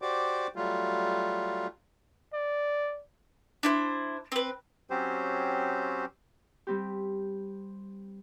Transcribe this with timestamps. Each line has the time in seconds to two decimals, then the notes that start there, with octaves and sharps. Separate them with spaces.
0.02 F#4 G4 C5 D5 D6
0.56 F#3 G3 A3 F4
2.34 D5
3.63 D4 E4 C5
4.32 C4 B4
4.90 F#3 C4 C#4 G4 C5
6.67 G3 C4 G4